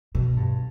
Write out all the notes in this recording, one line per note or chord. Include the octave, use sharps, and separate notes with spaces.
B2
G2